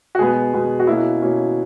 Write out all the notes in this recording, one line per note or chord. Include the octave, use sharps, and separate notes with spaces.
F#4
B2 G#3 B3 G#4
B2 G#3 B3
F#4
B2 A#3 C#4 E4
B2 A#3 C#4